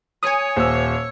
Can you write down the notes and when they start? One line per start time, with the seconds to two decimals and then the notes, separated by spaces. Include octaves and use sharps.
0.23 C#5 G#5 D#6
0.56 D#1 C5 E6